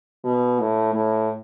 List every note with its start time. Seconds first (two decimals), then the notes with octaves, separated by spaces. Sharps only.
0.25 B2
0.60 A2
0.94 A2